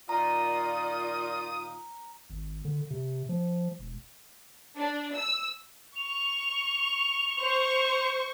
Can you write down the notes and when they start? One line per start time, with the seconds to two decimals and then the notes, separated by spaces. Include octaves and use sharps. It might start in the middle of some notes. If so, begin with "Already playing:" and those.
0.09 A#2 D#3 F4 D5 A#5 D#6
2.30 G#1
2.65 D3
2.90 C3
3.29 F3
3.79 E1
4.77 D4
5.15 E6
5.96 C#6 F7
7.37 C5 C#6